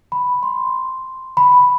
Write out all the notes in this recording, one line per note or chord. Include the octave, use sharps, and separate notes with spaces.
B5
C6
B5